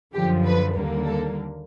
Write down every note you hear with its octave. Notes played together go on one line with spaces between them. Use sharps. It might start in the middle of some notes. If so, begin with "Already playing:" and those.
F#2 D3 F3 G4
B4
D#2 D3 G3 A#3
A4